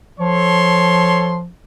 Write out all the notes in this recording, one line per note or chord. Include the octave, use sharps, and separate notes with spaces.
F3 A4 C#5 C6